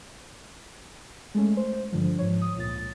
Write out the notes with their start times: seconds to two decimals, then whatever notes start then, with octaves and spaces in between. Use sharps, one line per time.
1.35 G#3 A3 C#4
1.57 C5
1.92 G2 D3 F3
2.19 G#2 F3 C#5
2.42 D#6
2.56 C#2 A#2 A6